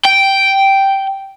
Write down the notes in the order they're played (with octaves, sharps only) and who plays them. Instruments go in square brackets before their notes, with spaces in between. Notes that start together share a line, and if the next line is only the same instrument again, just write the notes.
[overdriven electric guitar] G5